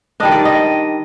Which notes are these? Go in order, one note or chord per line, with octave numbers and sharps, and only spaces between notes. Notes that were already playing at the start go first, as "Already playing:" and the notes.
D#3 G3 D4 D#5
D5
D#5